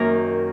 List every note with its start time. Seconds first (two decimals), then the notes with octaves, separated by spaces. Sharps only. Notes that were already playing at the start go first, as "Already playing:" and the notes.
Already playing: F#2 D#3 A#3 A#4